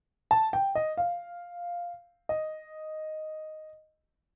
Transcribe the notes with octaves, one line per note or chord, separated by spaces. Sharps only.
A5
G5
D#5
F5
D#5